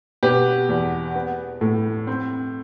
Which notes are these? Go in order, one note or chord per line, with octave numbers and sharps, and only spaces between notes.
B2 G4 B4
E2
B3
A2
C4